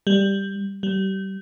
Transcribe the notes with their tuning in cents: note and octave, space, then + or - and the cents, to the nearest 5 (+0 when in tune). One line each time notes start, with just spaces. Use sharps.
G3 +5
G3 -30